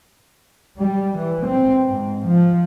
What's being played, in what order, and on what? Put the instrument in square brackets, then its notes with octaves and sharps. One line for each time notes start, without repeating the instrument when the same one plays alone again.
[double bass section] G3
E3
C4
G#2
F3